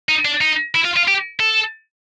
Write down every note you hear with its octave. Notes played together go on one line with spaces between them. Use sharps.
D#4
D4
D#4
E4
F4
F4
G4
A4